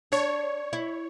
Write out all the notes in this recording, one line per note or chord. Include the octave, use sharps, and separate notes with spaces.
D4 C#5
E4